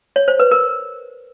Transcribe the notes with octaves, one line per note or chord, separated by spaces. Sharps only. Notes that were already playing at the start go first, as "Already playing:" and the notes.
C#5
C5
B4
A#4